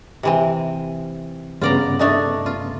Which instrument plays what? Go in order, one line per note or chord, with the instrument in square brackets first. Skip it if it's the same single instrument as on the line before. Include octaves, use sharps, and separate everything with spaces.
[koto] C3 E3 C4
[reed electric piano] G2 C#3 B3 [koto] F4 D5 A#5
[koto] A3 D4 D#4
F4